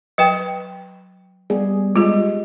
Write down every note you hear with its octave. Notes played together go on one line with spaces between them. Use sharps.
F#3 B4 G5
G3 B3 G#4
G#3 F4 G4